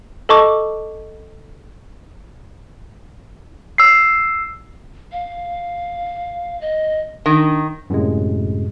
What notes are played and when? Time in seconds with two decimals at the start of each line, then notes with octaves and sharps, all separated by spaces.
0.29 A4 D#5 A5 C#6 D6
3.78 E6 C7
5.12 F5
6.61 D#5
7.26 D#3 D4
7.90 F#2 A2 C3 G#3